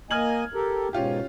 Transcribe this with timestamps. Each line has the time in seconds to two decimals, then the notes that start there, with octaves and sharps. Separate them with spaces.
0.11 A#3 D#5 G#5 F6 G#6 F#7
0.54 G4 A4 A#4
0.93 G#2 B2 C#4 F4 G4